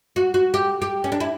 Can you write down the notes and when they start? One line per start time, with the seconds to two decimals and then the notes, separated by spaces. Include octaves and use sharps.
0.16 F#4
0.34 F#4
0.54 G4
0.82 G4
1.04 C#4
1.12 D4
1.20 E4